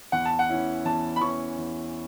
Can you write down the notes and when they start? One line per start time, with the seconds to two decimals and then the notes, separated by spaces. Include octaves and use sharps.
0.12 E2 F#5
0.26 A5
0.39 F#5
0.49 E3 C#4 E4
0.85 E2 A5
1.16 B5
1.21 E3 C#4 E4 C#6
1.58 E2